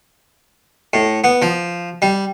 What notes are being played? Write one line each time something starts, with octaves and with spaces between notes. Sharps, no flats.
A2
B3
F3
G3